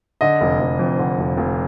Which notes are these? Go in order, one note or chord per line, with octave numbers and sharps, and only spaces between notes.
D3 D#5
F1
F1
F2
D3
F1
F1